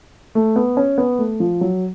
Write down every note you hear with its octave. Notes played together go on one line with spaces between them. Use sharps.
A3
B3
C#4
B3
A3
F3
F#3